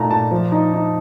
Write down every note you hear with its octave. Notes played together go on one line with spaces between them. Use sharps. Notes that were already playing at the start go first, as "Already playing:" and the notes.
Already playing: A#2 A3 D#4 A5 A#5
A#2 A5
F3
D#4
D#4